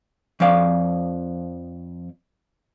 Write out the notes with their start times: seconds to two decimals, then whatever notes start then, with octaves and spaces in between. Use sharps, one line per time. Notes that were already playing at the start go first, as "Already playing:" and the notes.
0.40 F2 F3 D5 F5